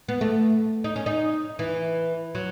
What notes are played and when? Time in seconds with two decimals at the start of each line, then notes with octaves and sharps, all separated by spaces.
0.08 B3
0.21 A3
0.84 D#4
0.96 C#4
1.06 D#4
1.59 E3
2.35 F#3